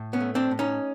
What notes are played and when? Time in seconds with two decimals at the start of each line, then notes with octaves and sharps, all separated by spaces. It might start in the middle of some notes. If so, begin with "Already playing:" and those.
Already playing: A2
0.13 B3 C#4
0.20 A3
0.35 C4 D4
0.51 A2
0.59 C#4 D#4